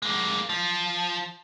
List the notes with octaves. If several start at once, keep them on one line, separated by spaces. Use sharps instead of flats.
G#3 A#3
F3